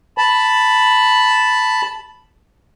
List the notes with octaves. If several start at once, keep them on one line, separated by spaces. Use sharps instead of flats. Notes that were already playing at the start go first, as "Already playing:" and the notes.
A5 B5